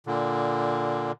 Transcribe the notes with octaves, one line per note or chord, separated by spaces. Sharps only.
A#2 D3